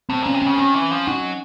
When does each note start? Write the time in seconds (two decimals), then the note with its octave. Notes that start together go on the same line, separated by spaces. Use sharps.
0.09 A2 C4
0.22 A#2 C#4
0.34 C3
0.42 C#3 C#4
0.58 D#3 C#4
0.74 E3
0.91 F3
1.07 F#3 D#4